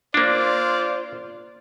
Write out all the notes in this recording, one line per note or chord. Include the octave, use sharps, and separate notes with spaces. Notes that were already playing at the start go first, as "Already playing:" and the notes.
A#3 D4 F4 C5 D5